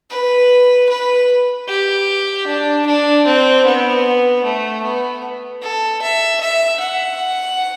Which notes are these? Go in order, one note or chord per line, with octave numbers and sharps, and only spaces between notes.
B4
B4
G4
D4
D4
C4
B3
A3
B3
A4
E5
E5
F#5